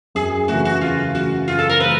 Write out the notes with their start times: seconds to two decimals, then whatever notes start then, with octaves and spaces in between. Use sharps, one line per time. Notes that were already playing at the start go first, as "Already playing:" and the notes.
0.15 F#2 G#4
0.48 C#3 E3 A3 F#4
0.65 F#4
0.81 F#2 F4
1.15 C#3 E3 A3 F#4
1.48 F#2 F4
1.59 A4
1.69 A#4
1.80 C#3 E3 A3 B4